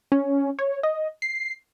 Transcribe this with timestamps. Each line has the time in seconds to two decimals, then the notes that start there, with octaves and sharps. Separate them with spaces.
0.12 C#4
0.59 C#5
0.83 D#5
1.22 C7